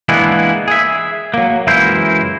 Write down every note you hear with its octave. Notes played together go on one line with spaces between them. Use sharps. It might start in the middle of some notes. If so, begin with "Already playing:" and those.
E3 G#3 A#3 B3 D4 E4
G#4 E5
F#3 A#3
C#2 F#2 E3 E4 A#4 C5